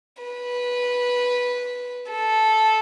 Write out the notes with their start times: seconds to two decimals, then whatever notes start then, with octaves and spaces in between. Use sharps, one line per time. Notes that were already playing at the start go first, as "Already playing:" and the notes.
0.23 B4
2.11 A4